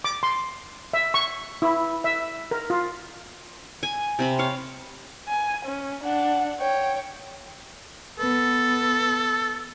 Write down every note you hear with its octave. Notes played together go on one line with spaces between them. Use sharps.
D6
C6
E5
C#6
E4
E5
A#4
F4
G#5
C3 C4 B5
C#5 F5
G#5
C#4
D4 F#5
C#5 G5
B3 A4